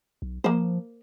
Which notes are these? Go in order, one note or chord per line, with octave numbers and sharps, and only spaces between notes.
B1
F3 A#3 C5